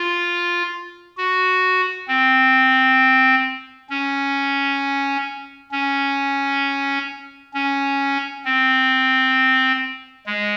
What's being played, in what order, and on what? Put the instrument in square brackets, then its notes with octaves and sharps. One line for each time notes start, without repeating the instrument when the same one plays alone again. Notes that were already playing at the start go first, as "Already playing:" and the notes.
Already playing: [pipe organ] F4
F#4
C4
C#4
C#4
C#4
C4
G#3